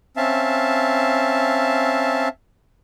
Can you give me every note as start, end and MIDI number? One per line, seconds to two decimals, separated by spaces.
0.17 2.28 60
0.17 2.28 61
0.17 2.28 76
0.17 2.28 77
0.17 2.28 81